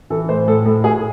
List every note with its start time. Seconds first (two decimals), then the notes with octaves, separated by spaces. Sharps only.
0.10 E3 A4
0.29 A2 C5
0.47 A2 A4
0.65 A2 A4
0.84 A2 G#4